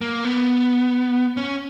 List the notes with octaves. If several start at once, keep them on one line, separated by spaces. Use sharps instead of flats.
A#3
B3
C#4